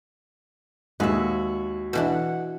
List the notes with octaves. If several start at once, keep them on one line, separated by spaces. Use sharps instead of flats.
D#2 G#3 F#4 B4 E5
B2 E3 D4 F#5